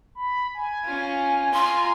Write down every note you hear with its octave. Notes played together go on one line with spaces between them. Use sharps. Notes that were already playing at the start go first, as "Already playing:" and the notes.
B5
G#5
C#4 F4
F4 G#5 A#5 C6